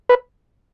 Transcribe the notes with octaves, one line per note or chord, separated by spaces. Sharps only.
B4